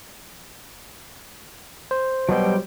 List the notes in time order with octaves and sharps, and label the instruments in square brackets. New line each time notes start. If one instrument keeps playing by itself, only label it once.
[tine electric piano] C5
[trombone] B2 [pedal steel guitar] F#3 G3 G5